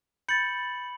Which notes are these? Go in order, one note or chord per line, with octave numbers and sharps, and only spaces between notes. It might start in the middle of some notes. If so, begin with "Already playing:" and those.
B5 G6 A6 C#7 F#7